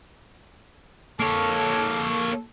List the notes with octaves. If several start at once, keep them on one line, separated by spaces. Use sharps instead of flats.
A#3 A4 C#5